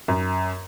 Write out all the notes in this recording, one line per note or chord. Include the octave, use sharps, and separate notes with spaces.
F#2